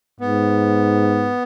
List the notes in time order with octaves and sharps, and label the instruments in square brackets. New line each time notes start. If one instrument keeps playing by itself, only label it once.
[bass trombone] G#2 [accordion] B3